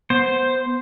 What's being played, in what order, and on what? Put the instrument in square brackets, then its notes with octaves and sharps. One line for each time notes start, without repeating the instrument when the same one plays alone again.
[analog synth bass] B3 [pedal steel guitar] C5